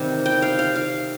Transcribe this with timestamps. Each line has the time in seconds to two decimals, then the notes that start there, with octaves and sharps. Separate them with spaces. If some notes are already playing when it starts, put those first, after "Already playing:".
Already playing: C3 D#3 G3
0.26 G5
0.42 F5
0.59 F5
0.76 F5